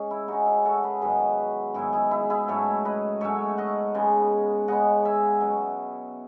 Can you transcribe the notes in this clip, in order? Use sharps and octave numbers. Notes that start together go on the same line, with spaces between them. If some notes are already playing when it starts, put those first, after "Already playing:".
Already playing: G#3 C#4 G#4
E4
C#3 G#3 C#4 D#4 F#4
E4 G#4
F#4 A4
G#4 B4
G#2 D#3 F#3 B3 G#4 B4
G#2 D#3 F#3 B3 E4 G#4
E4 G#4
E4 G#4
E4 G#4
G#2 F#3 A3 C#4 A4 C#5
B4 D#5
G#2 F#3 A3 C#4 C#5 E5
D#5 F#5
C#3 G#3 B3
C#3 G#3 B3 D#5 F#5
E5 G#5
B2 F#3 C#4